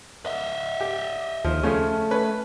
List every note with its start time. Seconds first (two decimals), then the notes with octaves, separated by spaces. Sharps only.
0.26 D#5 E5
0.81 G4
1.44 D#2 F3
1.63 C#3 F3 A3 C#4
2.11 C#4 B4